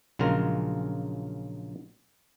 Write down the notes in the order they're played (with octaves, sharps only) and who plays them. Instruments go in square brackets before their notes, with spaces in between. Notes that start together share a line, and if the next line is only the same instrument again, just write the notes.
[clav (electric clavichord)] A#1 C#3 F#3 G#3 F4 A#4